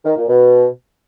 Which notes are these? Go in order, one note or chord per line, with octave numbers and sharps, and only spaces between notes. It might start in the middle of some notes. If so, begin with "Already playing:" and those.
D#3
A#2
B2